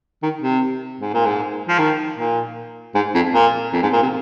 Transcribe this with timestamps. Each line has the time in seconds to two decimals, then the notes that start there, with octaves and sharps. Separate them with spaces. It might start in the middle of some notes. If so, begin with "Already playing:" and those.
0.23 D#3
0.42 C3
1.01 G#2
1.14 A#2
1.26 G#2
1.69 F3
1.79 D#3
2.18 A#2
2.95 G#2
3.15 F2
3.34 A#2
3.73 F2
3.83 G#2
3.93 A#2
4.02 C3